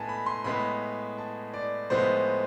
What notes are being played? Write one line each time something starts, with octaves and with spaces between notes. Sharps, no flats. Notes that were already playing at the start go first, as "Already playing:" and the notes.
Already playing: A2 G#3 B3 G#5 A5
B5
C6
A2 G#3 B3 B5
A5
D5
A2 F3 G#3 B3 C5